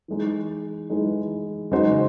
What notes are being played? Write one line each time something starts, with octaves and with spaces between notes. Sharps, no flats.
E3 G#3 D#4
E3 G#3 D#4
C#3 G#3 D#4 F#4 C5